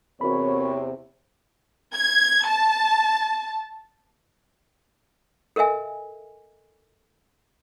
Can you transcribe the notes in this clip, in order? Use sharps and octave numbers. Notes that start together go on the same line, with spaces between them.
E2 C3 C4 F#4 A#4 C#5 B5
G#6
A5
A4 A#4 D#5 E5 G#5